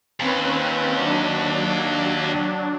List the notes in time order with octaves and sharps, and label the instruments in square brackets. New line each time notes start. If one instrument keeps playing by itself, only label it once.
[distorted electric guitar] D#2 [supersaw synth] C4 C#4 B4
[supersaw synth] F#3 D4